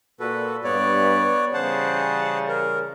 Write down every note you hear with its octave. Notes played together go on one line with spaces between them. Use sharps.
A#2 F#4 A4 B4
G2 B3 C#5 D5
C#3 E3 G3 C5 F#5 A5
A#4